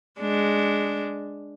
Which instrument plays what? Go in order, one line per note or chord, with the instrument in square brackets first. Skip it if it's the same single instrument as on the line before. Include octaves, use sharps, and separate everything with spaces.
[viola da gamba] G#3 D4